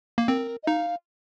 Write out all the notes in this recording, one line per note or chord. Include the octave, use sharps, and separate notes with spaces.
A#3
C4 A#4
D#5
D#4 F5